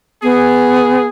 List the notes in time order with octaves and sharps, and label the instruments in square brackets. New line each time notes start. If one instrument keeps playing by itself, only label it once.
[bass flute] B3 [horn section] G#4